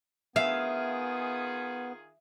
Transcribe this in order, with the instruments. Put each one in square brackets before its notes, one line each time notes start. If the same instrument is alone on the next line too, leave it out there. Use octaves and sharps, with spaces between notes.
[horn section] D#3 F4 G#4 [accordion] B3 [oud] E5 [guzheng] F5